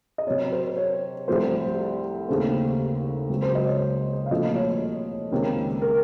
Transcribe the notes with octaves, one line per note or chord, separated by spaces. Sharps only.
D#5
C3 F#3 C4 C#5
C5
C#5
C2 C3 F3 A3 C5
D#2 C#3 A3 C4
C#2 C#3 F#3 C4
C5
D#5
C#5
F5
C2 A#2 F3 A3 C4 D#5
C#5
C#2 C3 D#3 A#3 C#4
A#4